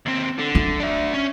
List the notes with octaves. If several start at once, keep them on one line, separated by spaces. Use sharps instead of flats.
D#2 C4
D3
E4
D4 E5
C#4